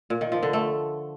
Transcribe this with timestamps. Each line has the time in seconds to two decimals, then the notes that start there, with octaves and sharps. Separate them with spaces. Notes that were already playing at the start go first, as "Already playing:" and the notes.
0.10 A#2
0.21 D#3
0.32 F3
0.43 D3
0.53 A3